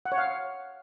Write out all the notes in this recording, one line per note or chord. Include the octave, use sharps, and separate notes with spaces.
F#5
C#5
F5